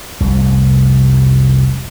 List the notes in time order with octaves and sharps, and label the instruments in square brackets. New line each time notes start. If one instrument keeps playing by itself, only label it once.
[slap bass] F1 C2